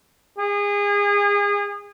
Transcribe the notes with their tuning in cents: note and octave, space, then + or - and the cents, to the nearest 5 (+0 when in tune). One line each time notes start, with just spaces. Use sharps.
G#4 -30